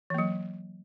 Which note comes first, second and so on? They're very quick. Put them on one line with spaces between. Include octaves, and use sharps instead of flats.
E3 A#3 F#3